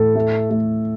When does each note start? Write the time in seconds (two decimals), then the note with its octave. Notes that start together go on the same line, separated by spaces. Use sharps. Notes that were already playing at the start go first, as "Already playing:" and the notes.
Already playing: A2 A4
0.16 A3
0.50 A3